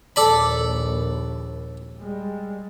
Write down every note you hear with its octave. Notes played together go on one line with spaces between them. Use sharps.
A#1 D#2 A4 D5 B5
G3 G#3